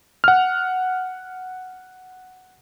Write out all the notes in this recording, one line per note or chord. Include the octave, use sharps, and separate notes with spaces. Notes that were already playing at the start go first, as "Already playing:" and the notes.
F#5 F6